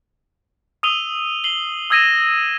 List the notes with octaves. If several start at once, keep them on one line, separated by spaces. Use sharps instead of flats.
D#6 E6 D#7 F7 G7
C7 F#7 G7
D#6 E6 G#6 A#6 D#7 E7